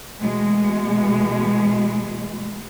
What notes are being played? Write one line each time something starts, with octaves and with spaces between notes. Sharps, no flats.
B2 E3 G#3 A3